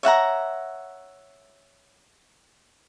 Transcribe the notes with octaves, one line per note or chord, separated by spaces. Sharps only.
C#5 E5 F#5 A#5